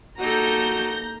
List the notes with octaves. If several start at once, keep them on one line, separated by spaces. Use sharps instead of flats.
A#3 D#4 F#4 G4 A4 A#5 G6 A#6